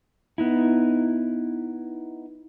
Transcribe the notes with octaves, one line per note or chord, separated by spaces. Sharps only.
B3 D#4 E4